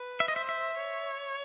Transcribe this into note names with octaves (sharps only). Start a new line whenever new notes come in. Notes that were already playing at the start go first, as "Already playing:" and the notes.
Already playing: B4
E5
D#5
C5 E5
E5
C#5